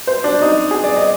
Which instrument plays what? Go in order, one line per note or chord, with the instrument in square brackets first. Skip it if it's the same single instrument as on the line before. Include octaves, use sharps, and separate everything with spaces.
[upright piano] C5
D4
D#4
G#4
D5
D#5